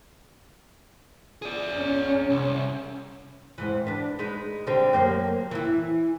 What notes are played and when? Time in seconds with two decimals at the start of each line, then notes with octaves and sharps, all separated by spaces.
1.42 G#4 D5
1.74 C#4
2.29 C2
3.58 F2 G#2 E3
3.87 D4 B4
4.19 G#3 D#4 B4
4.67 D3 G3 C4
4.93 F#2 A#3 C5
5.51 E3 E4